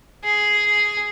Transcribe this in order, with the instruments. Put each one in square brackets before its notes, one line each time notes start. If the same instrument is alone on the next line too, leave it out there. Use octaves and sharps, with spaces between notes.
[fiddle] G#4